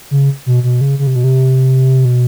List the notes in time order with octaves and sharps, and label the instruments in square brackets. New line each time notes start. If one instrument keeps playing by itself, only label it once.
[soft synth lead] C#3
B2
B2
C#3
C#3
C3
B2
C3
B2